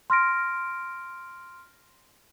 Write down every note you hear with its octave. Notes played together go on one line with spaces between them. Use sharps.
C6 F6 A#6 D7